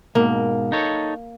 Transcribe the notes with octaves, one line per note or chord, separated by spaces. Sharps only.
G#2 B2 A#3
D#4 A4 C#5